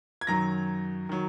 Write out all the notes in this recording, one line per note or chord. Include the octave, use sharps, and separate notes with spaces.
G#6
F#2 D#3 F#3 A#5 A#6
D#3 F#3